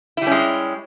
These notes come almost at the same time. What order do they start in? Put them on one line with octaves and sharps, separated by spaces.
E4 G3 C#4 G#3